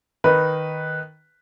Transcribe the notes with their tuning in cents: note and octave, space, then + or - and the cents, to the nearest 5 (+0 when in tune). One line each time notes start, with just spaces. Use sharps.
D#3 +0 D#4 +0 B4 +0